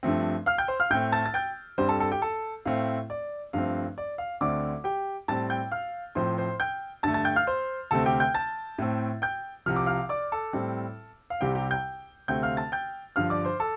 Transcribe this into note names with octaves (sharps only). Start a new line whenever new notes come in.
G2 F3 A3 C4
F5 F6
G5 G6
C5 C6
F5 F6
A2 A3 C4 G5 G6
A5 A6
A6
G5 G6
G2 G3 C4 C5 C6
A4 A5
A4 A5
G4 G5
A4 A5
A2 A3 C4 F5
D5
G2 F3 A3 C4 F5
D5
F5
D2 D3 A3 C4 D5 D6
G4 G5
A2 G3 C4 A5 A6
G5 G6
F5 F6
A2 F3 C4 C5 C6
C5 C6
G5 G6
G2 D3 A3 A5 A6
A5 A6
G5 G6
F5 F6
C5 C6
D2 C3 A3 C4 A4 A5
G4 G5
G5 G6
A5 A6
A2 A3 C4
G5 G6
C2 C3 F3 F6
D6
F5 F6
D5 D6
A4 A5
A2 G3 C4
F5
C2 C3 G3 C4 G4 G5
G4 G5
G5 G6
D2 C3 A3 C4 G5 G6
F5 F6
A5 A6
G5 G6
G2 D3 F3 F5 F6
D5 D6
C5 C6
A4 A5